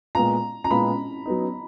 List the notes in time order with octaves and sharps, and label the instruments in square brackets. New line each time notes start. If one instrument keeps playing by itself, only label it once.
[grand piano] A#2 G#3 B3 F4 [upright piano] A#5
[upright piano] A#5
[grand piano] A#2 G#3 B3 F4 [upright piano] B5
[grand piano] F#3 B3 D#4